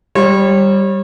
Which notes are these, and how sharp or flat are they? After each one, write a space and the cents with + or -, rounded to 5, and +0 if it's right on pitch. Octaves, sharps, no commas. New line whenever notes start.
G3 +0 C#5 -35